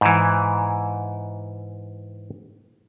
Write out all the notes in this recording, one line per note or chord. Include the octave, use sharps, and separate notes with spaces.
G#2 E3